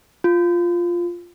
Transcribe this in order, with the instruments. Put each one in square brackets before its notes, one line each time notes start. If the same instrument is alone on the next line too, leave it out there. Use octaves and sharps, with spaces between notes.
[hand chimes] F4